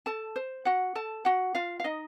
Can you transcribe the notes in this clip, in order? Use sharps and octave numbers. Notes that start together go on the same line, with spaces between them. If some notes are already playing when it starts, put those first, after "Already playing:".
A4 A5
C5
F#4 F#5
A4 A5
F#4 F#5
F4 F5
F5
D#4 D#5